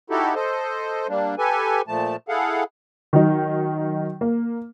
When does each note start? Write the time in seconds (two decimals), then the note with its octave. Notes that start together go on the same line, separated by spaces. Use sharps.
0.10 D#4 E4 F#4 G4 A4
0.35 A4 C5 D#5
1.08 G3 A#3 D4
1.38 G4 A4 B4 G#5
1.88 A#2 F3 A3 A5
2.29 E4 G#4 A4 F5 F#5
3.13 D#3 F#3 D#4
4.21 A#3